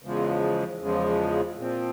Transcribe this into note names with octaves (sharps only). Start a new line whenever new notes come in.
E2 C#3 F3 G#3
E2 C#3 F3 G#3
A#2 F3 C4